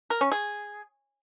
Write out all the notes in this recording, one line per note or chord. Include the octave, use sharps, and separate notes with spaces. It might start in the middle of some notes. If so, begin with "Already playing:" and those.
A#4
C#4
G#4